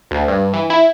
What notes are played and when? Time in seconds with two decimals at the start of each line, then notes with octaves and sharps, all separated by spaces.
0.11 D2
0.28 G2
0.53 E3
0.70 E4